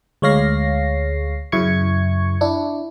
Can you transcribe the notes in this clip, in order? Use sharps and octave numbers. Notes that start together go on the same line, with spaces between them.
D2 G#3 C#5 F5 A#6 C7
F#2 C#3 E4 C#6 G#6 C#7
D4 E4